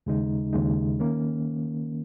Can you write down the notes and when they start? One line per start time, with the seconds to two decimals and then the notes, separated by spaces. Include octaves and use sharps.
0.06 D#2 C#3 G#3 D#4
0.53 D#2 C#3 G#3 D#4
1.00 D#3 A#3 C#4